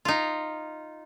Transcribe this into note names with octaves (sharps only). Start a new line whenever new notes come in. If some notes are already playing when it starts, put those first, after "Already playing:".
D#4 F4